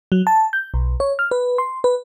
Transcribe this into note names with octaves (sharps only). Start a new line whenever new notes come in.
F#3
A5
G6
B1
C#5
F6
B4
C6
B4